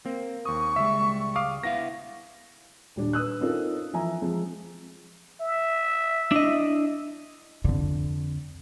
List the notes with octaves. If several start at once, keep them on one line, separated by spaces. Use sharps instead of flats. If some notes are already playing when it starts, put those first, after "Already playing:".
A#3 C4
D#2 C#6 D#6
C#2 G3 G#3 E5
F5 D6 D#6
B3 E4 F5 A#6
D#1 G3 D4
B4 D#6 E6 F#6
C4 C#4 D#4 F4 A4 A#4
E3 F3 E5 G#5 A#5
F3 G#3 C4
E5
D4 E4 D#5
F2 D3